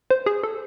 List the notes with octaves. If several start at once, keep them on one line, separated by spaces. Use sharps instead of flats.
C5
G#4
A4